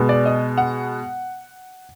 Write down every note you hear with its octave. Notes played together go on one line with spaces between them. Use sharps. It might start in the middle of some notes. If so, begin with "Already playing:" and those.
Already playing: B2 G#3 B3
D5
D#5
F#5